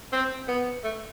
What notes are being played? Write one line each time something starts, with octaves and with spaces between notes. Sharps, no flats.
C4
B3
A3